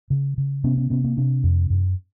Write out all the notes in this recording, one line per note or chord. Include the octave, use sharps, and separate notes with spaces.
C#3
C#3
C3 B3 C#4
B3 C#4
C3 B3 C#4
A#3 C4
C3 C4 D4
F2
F#2